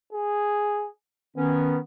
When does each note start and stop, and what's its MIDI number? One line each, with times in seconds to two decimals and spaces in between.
0.13 0.90 68
1.37 1.77 51
1.37 1.78 59
1.37 1.77 61